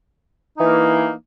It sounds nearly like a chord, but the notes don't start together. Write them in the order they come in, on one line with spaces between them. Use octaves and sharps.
D#4 E3 A#3